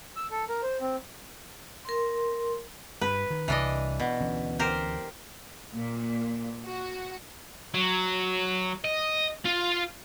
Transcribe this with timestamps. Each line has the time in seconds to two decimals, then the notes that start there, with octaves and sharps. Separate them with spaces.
0.16 E6
0.31 A4
0.49 A#4
0.63 C5
0.81 C4
1.85 A#4 C6
3.01 G2 B4
3.30 D#3
3.48 C2 E3 D4 D#5
4.00 B2
4.20 D2 E3 C#4
4.59 G4 A#4 C5
5.74 A#2
6.66 F#4
7.74 F#3
8.84 D#5
9.45 F4